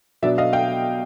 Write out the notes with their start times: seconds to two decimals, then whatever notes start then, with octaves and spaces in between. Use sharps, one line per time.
0.22 B2 F#3 B3 D4 D5 E5
0.38 D#5 F5
0.53 F5 G5